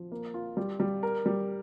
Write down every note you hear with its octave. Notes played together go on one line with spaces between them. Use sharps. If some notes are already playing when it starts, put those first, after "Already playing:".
Already playing: F3
A#3
F4
G3
G3
A#4
G3